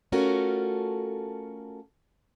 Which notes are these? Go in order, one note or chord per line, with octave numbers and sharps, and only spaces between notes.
A3 C#4 F4 F#4 A4 A#4